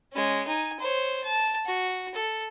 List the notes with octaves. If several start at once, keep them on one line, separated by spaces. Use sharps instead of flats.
G#3 C#4
D#4 G#5
C5 C#5
A5
F#4
A4